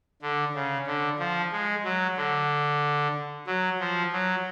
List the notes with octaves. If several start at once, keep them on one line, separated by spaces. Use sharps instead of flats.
D3
C#3
D3
F3
G#3
F#3
D3
F#3
F3
F#3